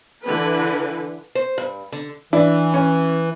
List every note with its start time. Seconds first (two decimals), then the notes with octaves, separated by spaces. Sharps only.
0.24 D3 E3 B4
1.35 C5
1.58 G2
1.92 D3
2.33 E3 D4 E4
2.74 C#4